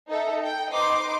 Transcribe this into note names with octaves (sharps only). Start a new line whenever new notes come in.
D#4 A4 E5
G5
D#4 B4 C5 D#5 C6 D6